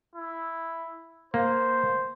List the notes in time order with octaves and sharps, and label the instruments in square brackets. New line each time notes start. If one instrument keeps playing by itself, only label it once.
[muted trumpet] E4
[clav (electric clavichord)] A#3 [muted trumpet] C5